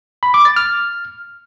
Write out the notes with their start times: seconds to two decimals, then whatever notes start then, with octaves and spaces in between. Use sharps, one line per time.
0.23 B5
0.34 D6
0.45 A6
0.56 F6